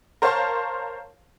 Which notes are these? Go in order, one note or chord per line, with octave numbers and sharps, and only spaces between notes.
A#4 C5 C#5 F5 A5 C6